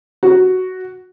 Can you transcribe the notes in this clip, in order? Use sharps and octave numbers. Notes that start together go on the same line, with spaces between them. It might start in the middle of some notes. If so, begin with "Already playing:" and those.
F#4